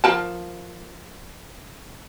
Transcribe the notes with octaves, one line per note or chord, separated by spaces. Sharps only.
F3 A#4 A5